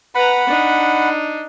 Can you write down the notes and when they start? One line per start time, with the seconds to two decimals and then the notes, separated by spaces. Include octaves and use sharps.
0.15 B4 F#5 A#5 B5
0.47 D4 D#4